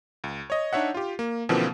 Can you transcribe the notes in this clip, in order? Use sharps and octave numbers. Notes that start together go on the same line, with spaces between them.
C#2
C#5 D#5
D4 D#4 C#5 E5 F#5
F4 G4
A#3
B2 D3 E3 F3 A#3 C4